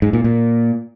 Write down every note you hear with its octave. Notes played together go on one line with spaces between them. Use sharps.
G#2
A#2
A#2